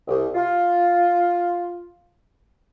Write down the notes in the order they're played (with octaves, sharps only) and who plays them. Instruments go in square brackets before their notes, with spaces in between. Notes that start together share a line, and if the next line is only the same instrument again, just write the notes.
[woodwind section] C2
F4